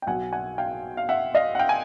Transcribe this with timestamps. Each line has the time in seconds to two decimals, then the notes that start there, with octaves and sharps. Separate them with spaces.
0.02 G5
0.07 B1 B2 F#5 G#5
0.33 F#5 G#5
0.58 F5 G5
0.97 F5
1.09 E5 F#5
1.35 D#5 F5
1.55 F#5
1.59 F5 G5
1.69 G#5